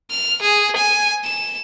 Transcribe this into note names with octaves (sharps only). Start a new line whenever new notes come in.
F6
G#4
G#5
E7